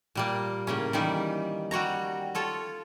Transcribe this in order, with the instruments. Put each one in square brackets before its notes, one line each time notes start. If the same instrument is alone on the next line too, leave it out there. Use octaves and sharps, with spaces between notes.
[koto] A#2 G3 A#3
A2 C#3 A#3 C#4
D#3 E3 G3 D#4
G3 F#4 C#5 A#5
F4 A4 C#5